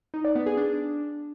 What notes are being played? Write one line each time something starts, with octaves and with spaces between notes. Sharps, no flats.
D#4
D5
B3
G#4
D4